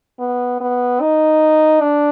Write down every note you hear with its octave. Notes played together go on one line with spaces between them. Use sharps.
B3
B3
D#4
D4